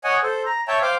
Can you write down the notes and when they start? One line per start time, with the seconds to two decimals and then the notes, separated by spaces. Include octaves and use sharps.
0.04 C#5 D#5 F#5 G#5
0.23 A4 C5
0.46 A#5
0.68 C#5 E5 G5 A5
0.82 C5 F5 G5 D6